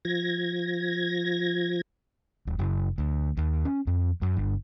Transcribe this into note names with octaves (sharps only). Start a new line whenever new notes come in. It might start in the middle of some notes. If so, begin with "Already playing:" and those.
F3 G#6 A#6
D#1
F#1
D2
D#2
C#4
F2
F#2
G1